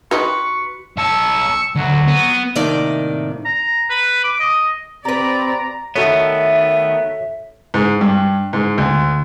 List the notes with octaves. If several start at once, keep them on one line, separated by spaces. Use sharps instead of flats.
D#4 F#4 G4 B4 D#5 C#6
B1 A5 C#6 E6
D2 F#3
B3
A2 C3 D#3 A#3 D#4 D5
A#5
B4
D6
D#5
C4 G4 B4 D5 A#5
D#3 A3 B3 F#4 A4 C#5 E5
G#2
G2
G#2
D2